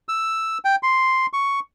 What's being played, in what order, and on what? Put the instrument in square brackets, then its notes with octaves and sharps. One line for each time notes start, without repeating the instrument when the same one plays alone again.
[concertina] E6
G5
C6
C#6